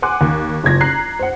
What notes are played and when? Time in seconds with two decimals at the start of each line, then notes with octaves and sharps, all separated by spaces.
0.02 F#5 G#5 C6 D6 F#6
0.21 D#2
0.64 F#1 C#2 G#6 A#6
0.81 A#5 F#6 C7
1.19 C5 F#5